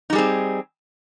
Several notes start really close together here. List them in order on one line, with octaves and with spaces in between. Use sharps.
D#4 G3 G#4 C4